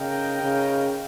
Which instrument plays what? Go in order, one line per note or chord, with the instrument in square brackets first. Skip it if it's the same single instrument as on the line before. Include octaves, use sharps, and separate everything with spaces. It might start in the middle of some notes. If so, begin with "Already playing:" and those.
Already playing: [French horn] C#3 [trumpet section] D#4 A#4 D#5 G5
[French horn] C#3